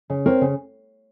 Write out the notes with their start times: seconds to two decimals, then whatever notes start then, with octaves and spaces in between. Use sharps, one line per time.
0.10 C#3
0.26 C4 A#4 C#5
0.41 C#3